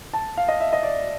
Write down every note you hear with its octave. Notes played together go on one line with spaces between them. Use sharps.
A5
F5
D#5
E5
D#5
D5